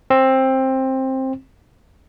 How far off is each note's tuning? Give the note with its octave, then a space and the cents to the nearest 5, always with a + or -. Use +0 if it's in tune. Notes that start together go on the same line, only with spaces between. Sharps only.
C4 +15